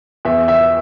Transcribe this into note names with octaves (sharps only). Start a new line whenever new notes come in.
E2 E5
E5